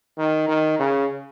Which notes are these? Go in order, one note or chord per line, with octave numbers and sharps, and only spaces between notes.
D#3
D#3
C#3